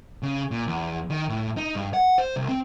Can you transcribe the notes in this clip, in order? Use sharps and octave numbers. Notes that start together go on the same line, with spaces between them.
C#3
A#2
E2
D#3
A2
D#4
G2
F#5
C5
C2
C4